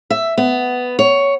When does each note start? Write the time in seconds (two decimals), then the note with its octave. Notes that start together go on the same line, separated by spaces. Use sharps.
0.10 E5
0.37 B3
0.99 C#5